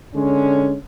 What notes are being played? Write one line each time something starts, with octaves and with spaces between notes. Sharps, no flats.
D3 G#3 C#4